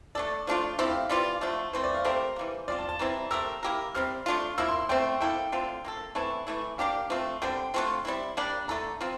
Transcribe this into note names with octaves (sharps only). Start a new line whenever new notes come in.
A3 D4 A4 D5
F3 A3 D4 F4
A3 C4 E4 G4 E5
F5
E3 G3 C4 F4 D5
D3 F3 A3
E3 A3 C4 C5
D5
F5
A3 C4 G4 A#4 C5
E3 G3 A#3
F3 C4 F4 D5
A5
A5
E3 G3 C4 E4 A#5
A3 C4 G4 A#4 E6
A#3 E4 G4 A#4
C3 G3 C4 F6
A3 D4 F4
F3 A#3 E4 E6
C6
C6
D3 A3 C4 G5
A#3 E4 A4 G5
D3 A3 C4 F4
A#3 F4 A4
E3 A3 C4 E4 A5
E3 A3 E4
A#3 D4 G4 F5
F3 A3 C4
D3 G3 C4 G5
D3 A3 C4 F4
G3 C4 E4
G3 A#3 D4
D3 A3 E4 A4 A#5
F3 C4